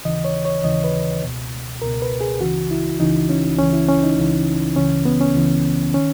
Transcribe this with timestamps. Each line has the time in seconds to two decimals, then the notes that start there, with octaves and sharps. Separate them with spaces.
0.05 D#2 C#3 E3 D#5
0.24 C#5
0.45 C#5
0.64 D#2 C#3 E3 D#5
0.84 B4
1.23 C#2 B2
1.82 C#2 B2 A#4
2.02 B4
2.21 G#4
2.41 C#2 C#3 E3 F#4
2.71 E4
3.00 C#2 C#3 E3 D#4
3.29 C#4
3.58 C#2 C#3 E3 C#4
3.73 E4
3.89 C#4
4.03 D#4
4.17 C#2 C#3 E3
4.76 C#2 C#3 E3 C#4
5.05 B3
5.21 C#4
5.35 C#2 C#3 E3
5.94 D#3 C#4